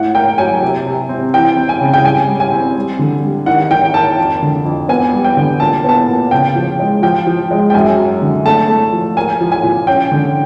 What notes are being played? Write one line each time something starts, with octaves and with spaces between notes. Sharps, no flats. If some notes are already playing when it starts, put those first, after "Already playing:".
Already playing: A2 F#5
A#3 G5
F#3 G#5
C3
C3
C4
E3 G5
C4
G#5
C#3
G5
G3 G#5
G3
G#5
C4
G3
D3
G3
D#3 F#5
D#3 G5
A#3 A5
F2
D3
F2
B3 G#5
G3
G5
D3
A#2 A5
B3 A5
A#2
C#3 G5
F3
G#3
F3 G5
F3
G#3
G5
F#2 G#5
F#3
D3
A3 A5
A3
F3
A#3 G#5
F3
G#5
A#2
C#4 G5
D3